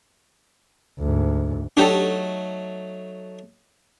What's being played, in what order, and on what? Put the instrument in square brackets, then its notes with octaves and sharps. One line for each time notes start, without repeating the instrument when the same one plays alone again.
[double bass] D2 G#2
[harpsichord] F#3 A3 D#4 [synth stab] D4 G4 A4